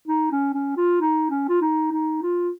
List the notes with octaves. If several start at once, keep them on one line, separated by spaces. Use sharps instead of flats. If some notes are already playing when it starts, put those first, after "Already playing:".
D#4
C#4
C#4
F4
D#4
C#4
F4
D#4
D#4
F4